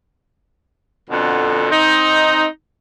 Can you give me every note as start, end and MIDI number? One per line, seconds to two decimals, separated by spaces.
1.10 1.67 41
1.10 1.67 47
1.10 1.67 50
1.69 2.44 60
1.69 2.44 63